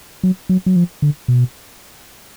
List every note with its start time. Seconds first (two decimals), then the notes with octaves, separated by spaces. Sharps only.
0.23 F#3
0.49 F#3
0.66 F#3
0.76 F3
1.02 D3
1.28 B2